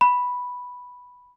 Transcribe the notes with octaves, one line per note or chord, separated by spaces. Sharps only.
B5